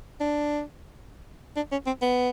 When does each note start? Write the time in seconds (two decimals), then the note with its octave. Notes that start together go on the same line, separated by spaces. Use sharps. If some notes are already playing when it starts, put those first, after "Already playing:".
0.20 D4
1.56 D4
1.72 C#4
1.87 C4
2.02 B3